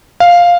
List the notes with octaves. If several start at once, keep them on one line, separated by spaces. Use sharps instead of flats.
F5